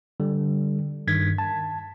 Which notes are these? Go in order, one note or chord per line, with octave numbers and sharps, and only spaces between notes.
D3 G3
G2 D#3 G#6 B6
A5